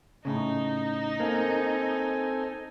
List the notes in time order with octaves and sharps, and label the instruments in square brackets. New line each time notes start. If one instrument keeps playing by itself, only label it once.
[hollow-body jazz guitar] A2 C#3 [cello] D#4
[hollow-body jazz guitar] A#3 [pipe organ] C4 A4 G#5